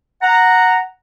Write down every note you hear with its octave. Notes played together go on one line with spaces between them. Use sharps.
F#5 A#5